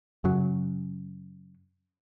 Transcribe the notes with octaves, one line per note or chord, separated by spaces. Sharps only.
F#2 C#3 F#3